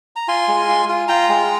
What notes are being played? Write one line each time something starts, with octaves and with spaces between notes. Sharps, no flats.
A#5
F4 G#5 C6
G#3
F4
F4
F4 G5 A#5
G#3